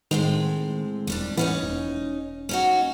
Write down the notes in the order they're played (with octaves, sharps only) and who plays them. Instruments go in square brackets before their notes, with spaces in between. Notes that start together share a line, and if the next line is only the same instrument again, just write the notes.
[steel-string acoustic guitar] A2 G#3 C4 [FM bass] D#3
[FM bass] E1 [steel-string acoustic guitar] D#2 G3 D4
[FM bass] E3 [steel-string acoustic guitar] B3 C#4 D#4
[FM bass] E1
[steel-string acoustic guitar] C#4 D#4 F#4